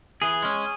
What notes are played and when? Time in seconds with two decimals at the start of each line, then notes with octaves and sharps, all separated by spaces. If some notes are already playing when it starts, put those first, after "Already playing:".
0.22 E3 G#4
0.43 G#3 C#4